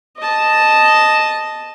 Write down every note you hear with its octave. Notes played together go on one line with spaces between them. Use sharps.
D#5 A5